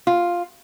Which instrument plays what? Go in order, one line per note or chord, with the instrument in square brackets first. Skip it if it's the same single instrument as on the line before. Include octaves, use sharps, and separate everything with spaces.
[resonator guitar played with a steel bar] F4